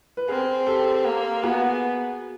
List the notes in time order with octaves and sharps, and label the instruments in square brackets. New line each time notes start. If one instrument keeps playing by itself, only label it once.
[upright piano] B4
[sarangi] C4 [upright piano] G#4 A#4
[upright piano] G4 A4
[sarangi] A#3
[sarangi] B3 [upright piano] F#4 G#4